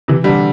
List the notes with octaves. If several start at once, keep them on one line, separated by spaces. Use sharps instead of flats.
C3 E3
D3 G3